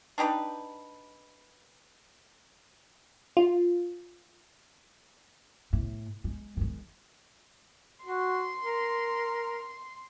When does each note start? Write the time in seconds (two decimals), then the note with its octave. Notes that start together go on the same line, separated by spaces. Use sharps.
0.18 D4 D#4 G4 B4
3.37 F4
5.73 A2
6.24 G#3
6.57 D#3 G#3
8.05 F#4 C6
8.62 A#4